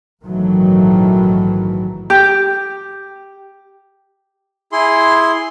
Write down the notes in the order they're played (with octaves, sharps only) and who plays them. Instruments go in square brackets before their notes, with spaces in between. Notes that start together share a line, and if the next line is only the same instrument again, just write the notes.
[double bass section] A#1 G#2 D#3 E3 F#3 A3
[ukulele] G4
[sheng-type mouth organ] E4 G#4 C6